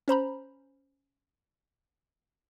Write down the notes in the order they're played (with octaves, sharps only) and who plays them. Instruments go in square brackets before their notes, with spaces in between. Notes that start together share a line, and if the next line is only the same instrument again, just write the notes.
[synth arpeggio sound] C#4 C5 A#5 B5